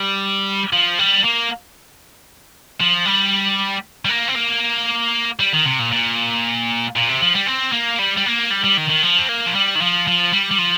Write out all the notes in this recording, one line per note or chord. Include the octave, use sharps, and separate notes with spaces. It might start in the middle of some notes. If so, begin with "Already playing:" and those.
Already playing: G3
F3
G3
A#3
F3
G3
G3
A#3
C4
A#3
G3
D#3
C3
A#2
A#2
A#2
C3
F3
G3
C4
A#3
G3
G3
A#3
G3
G3
D#3
D#3
F3
C4
A#3
F3
G3
D#3
F3
F3
G3
G3
F3